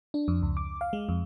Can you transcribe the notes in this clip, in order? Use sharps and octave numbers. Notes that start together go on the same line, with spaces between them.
D4
F2
C#2
D6
F5
G#3
F2